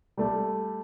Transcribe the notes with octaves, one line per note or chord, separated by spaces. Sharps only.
G3 A3